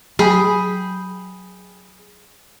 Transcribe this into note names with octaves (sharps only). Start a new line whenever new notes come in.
F#3 G#4 G5 B5